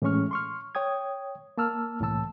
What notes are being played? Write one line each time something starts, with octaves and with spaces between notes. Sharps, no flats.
A2 E3 G#3 C#4 C#6 F6
C6 C#6 F6
C#5 G5 D#6 G#6
A#3 A5 E6 F6
C2 A2 E3 A5 E6